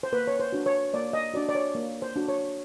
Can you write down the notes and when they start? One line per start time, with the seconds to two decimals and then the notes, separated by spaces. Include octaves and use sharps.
0.03 C5
0.12 A#3 B4
0.27 C#5
0.40 C5
0.52 D4 F#4
0.66 C#5
0.94 A#3 D5
1.13 D#5
1.34 D4 F#4 D5
1.49 D5
1.55 C#5
1.75 A#3
2.02 C5
2.16 D4 F#4
2.28 C#5